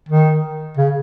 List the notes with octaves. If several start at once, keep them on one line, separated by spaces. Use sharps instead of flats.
D#3
C#3